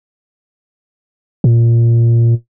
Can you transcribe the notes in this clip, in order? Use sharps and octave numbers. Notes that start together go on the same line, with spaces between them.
A#2